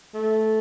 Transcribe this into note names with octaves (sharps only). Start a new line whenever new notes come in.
A3